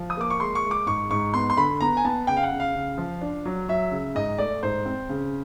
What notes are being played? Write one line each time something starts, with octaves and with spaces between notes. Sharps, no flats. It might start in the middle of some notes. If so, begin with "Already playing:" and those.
Already playing: F3
D#6
A#3 D6
C#6
G#3 C6
C#6
G#3
D6
G#2 C#6
G#2 C#6
B3 C6
C6
D3 B5
B3 A#5
G#5
B3 A5
C#3 G5
F5
F#5
C#3
F5
C#3
F3
D4
F#3
F#3 E5
C#3
G#2 D#5
A3 D5
G#2 C5
C4
C#3